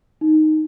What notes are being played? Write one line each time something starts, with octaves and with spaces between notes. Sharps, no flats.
D#4